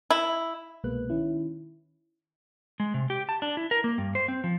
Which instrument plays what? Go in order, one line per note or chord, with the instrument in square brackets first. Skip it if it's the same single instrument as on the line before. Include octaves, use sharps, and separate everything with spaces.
[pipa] E4
[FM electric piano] C2 B2 G#3 A#3 B4 F#6
D#3 C#4 E4
[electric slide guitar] G#3
C3
G4
A5
D4
E4
A#4
A#3
G2
C5
C4
F3